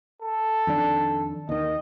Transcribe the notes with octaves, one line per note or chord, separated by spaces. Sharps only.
A4
F2 D#3 D4
D#2 D#3 D#5